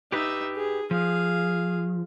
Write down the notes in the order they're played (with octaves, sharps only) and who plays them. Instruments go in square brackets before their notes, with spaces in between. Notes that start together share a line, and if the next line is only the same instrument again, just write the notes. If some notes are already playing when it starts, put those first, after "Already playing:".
[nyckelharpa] D#4 E5 [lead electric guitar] G4 B4
[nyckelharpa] G#4
[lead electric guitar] F3 [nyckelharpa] G#4 F5